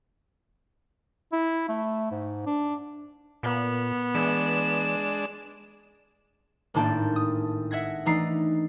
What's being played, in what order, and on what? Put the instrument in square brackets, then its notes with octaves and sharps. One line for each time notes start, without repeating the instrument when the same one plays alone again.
[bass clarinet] E4
A3
G#2
D4
[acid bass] A#2 [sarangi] B3
[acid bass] E3 [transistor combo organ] G#3 D4 [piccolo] E7
[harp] G#1 A2 A#3 D4 A5 G6
D#6
E5 F#5 G#6 A#6
E3 A3 D4 D#4 A#5 C7